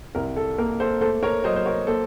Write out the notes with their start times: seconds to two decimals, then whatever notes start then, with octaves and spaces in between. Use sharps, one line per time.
0.15 C2 A#4
0.36 A4
0.58 A#3 A#4
0.80 A4 C5
1.01 A3 A4 C5
1.23 A#4 C#5
1.44 F#3 C5 D#5
1.56 C5
1.66 A#4 C#5
1.87 A#3 A4 C5